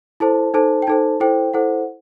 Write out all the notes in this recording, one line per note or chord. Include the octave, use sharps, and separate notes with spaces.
E4 A4 C5 A5
D#4 A4 C5 A5
G5
D#4 A4 C5 A5
E4 A4 C5 G5
E4 A4 C5 F#5